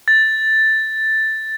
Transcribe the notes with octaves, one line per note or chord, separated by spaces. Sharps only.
A6